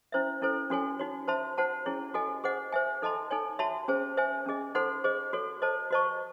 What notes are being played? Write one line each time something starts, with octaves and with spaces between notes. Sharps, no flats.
C#4 E4 C5 E5
C#4 E4 A4 C5
C#4 F#4 A4 C#5 G#5
D#4 F#4 C#5
C5 E5 A5 C6
D#4 F#4 C5 F#5 A5
C#4 E4 G#4 C#5
F#4 A4 D#5 G#5
G#4 C5 D#5 F#5
C5 E5 G#5
D#4 A4 D#5 A5 C6
D#4 A4 C#5 G#5
F#4 C#5 E5 A5 C6
C#4 G#4 C5
C5 E5 G#5
C#4 G#4 D#5
D#4 A4 C5 F#5 C6
G#4 C5 D#5
F#4 A4 C#5
A4 C5 D#5 A5
F#4 C5 D#5 A5 C#6